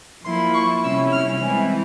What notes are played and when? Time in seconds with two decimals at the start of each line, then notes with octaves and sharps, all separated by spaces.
0.24 F3 A#3 E4 C6
0.54 C#6
0.82 C3 G3 C#4 E4 E6
1.12 F6
1.41 E3 G#3 C4 E4 G#5